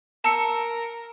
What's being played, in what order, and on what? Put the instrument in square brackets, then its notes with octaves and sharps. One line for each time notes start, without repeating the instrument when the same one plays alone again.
[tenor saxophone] A#4 [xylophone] A5 E6 C#7